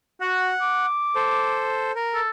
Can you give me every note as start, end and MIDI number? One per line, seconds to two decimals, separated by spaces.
0.21 0.51 66
0.21 0.86 78
0.61 1.72 86
1.16 1.92 69
1.16 1.92 72
1.96 2.20 70
2.14 2.30 69